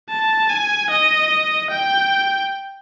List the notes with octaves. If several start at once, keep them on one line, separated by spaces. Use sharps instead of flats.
A5
G#5
D#5
G5